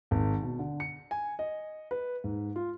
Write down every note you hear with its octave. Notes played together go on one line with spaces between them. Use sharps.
G#1
B2
D3
C#7
G#5
D#5
B4
G#2
F4